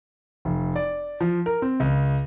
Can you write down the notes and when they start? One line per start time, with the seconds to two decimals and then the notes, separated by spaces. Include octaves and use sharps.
0.45 F1
0.76 D5
1.21 F3
1.46 A#4
1.62 C4
1.80 C#2